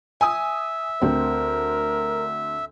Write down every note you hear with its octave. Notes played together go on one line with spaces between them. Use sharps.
E5 G#5 D#6
D2 C4 A#4